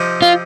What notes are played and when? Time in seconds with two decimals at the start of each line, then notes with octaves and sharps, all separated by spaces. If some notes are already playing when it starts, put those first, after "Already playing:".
Already playing: C3 F3 C4 D#4
0.22 F4